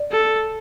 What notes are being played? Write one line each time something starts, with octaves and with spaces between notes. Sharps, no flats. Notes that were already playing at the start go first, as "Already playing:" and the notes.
Already playing: D5
A4